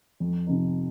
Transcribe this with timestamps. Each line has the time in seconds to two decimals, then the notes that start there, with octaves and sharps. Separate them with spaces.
0.20 F2
0.47 C3 F3 C4 D#4